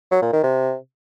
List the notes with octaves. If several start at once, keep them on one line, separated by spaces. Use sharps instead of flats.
F#3
A#2
D#3
C3